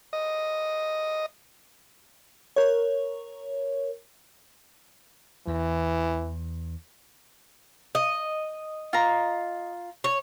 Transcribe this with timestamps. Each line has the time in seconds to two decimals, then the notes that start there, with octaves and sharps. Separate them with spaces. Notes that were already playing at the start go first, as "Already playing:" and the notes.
0.13 D#5
2.56 A#4 C#5
5.47 E2 E3
7.95 D#5
8.93 F4 A#5
10.04 C#5